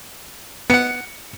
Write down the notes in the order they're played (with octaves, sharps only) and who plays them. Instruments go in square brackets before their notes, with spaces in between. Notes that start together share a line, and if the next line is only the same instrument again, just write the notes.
[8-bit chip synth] B3 F#5 [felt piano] C#7